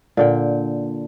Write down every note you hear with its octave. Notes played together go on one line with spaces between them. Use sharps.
A#2 D3 G5